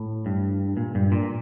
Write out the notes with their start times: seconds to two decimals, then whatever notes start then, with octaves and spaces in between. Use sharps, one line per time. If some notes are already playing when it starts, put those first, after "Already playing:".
Already playing: A2
0.26 G2
0.77 A#2
0.95 G2
1.12 A#2